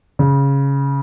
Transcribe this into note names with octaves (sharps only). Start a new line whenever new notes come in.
C#3